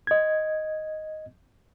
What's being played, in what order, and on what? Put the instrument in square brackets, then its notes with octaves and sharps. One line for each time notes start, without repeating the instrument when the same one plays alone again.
[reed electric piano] D#5 G#6